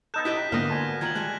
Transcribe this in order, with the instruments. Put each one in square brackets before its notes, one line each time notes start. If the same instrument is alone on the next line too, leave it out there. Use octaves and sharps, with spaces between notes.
[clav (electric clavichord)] B3 D#4 A4 [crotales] F#6 G6 E7
[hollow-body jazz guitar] E4 G4 D#5 [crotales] B6
[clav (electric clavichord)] A#1 D#5 [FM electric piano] G#2 D3 [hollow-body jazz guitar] A#3 B3 [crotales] F6 A#6
[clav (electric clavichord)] D2 [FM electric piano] G#5 A5
[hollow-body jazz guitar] D#3 F4 A#5 [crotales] G#6 F#7
[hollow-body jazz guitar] G3 G#3 [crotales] F#6